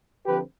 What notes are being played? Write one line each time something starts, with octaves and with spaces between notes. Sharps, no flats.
D3 F3 C4 G4 B4